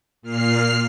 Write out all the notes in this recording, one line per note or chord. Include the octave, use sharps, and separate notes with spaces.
A#2 F6 C7